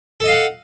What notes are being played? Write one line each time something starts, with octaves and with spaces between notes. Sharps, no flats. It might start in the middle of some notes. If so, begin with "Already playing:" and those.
A4 D#5 F5 F#5